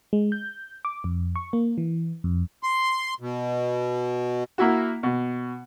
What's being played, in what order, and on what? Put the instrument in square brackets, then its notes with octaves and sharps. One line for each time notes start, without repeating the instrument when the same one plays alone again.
[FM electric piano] G#3
G6
D6
F2
C#6
A#3
E3
F2
[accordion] C6
B2
[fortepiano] A#3 E4 F#4
B2